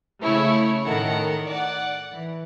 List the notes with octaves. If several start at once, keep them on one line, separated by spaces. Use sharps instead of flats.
C#3 A3 E4 C#5
A2 D#3 A4 A#4 F#5
D5 F#5
E3